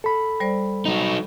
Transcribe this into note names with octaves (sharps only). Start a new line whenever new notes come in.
A4 B5
G3 C5 D5
F#3 D#4